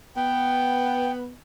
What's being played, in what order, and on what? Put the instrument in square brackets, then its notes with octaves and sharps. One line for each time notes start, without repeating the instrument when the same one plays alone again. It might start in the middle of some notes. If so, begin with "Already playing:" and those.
[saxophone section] B3 [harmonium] G5